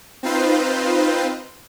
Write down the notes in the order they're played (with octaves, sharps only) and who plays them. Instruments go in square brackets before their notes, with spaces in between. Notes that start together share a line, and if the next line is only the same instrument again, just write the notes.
[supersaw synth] C4 D#4 F4 B4 C5